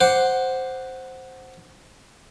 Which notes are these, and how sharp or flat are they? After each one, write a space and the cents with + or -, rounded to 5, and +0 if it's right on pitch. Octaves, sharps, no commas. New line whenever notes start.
C5 +0 F#5 +0 D6 +0